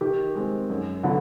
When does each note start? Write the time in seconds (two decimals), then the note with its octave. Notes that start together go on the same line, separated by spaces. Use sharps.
0.01 D#3 G4
0.35 G#3 C4
0.70 F#2
1.03 D3 F#3 B3